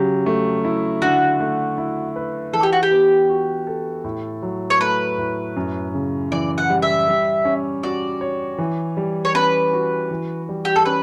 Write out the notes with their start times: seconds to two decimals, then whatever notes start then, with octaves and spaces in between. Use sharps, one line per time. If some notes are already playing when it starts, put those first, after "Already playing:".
Already playing: C#3 F#3 G4
0.26 A3
0.65 E4
1.02 D3 F#4
1.40 A3
1.78 E4
2.16 B4
2.53 E3 A4
2.63 G4
2.73 F#4
2.83 G4
2.91 B3
3.29 F#4
3.67 A4
4.04 A2
4.43 F#3
4.70 C#5
4.80 A3 B4
5.18 A2
5.56 F#2
5.94 C#3
6.32 E3 D5
6.58 F#5
6.70 G3
6.82 E5
7.08 G3
7.45 C#4
7.83 F#4 D5
8.21 C#5
8.58 E3
8.97 G3
9.25 C#5
9.35 C#4 B4
9.73 F#4
10.11 E3
10.49 G3
10.65 G4
10.76 A4
10.85 C#4 B4